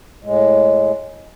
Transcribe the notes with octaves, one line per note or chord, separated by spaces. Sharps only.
A2 G#3